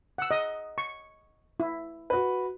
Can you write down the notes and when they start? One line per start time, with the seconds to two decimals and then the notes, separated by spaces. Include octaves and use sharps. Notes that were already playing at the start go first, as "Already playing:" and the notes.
0.18 F#5 E6
0.31 D#5
0.78 C#6
1.60 E4
2.10 F#4 B4